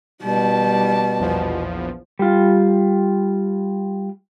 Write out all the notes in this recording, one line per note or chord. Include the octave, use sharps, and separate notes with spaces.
B2 G3 A5
A#1 E2 F3
G3 F4